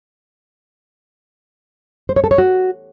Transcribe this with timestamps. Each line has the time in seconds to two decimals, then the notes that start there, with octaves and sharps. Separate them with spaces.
2.09 C5
2.16 C#5
2.24 A4
2.31 C#5
2.38 F#4